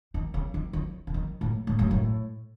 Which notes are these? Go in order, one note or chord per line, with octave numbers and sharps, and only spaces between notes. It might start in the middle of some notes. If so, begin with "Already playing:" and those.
D#3
C#3
D#3
D#3
C#3
D#3
A2
A2
F#2
A2